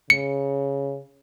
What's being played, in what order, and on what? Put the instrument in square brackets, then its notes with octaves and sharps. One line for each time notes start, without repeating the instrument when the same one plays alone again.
[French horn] C#3 [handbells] C#7